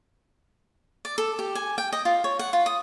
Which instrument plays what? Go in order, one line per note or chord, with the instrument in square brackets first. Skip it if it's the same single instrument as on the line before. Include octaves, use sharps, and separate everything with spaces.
[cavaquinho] D5
A4
G4
G#5
G5
D#5
F4
C#5
F#5
F4
D#6